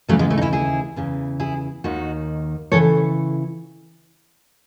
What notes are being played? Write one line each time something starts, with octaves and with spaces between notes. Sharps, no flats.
D#2 C#3 E3 F#3 A3
G#3 B3
A3 C#4
D#4
C#4 E4
E4 G#4
E2 C#3 E3
E4 G#4
D#2 D#3 D#4 F#4
C#3 E3 A4 C#5